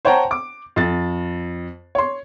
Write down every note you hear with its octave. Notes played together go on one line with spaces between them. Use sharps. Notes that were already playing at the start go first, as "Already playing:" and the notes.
C5 C#5 F#5 G5 A5 A#5
D6
F2 A6
C#5 C6